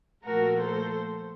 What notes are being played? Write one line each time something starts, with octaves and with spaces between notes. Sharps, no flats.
A#2 F3 A3 F#4 A#4
A4 C5